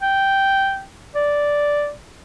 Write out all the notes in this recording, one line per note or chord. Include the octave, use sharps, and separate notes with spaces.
G5
D5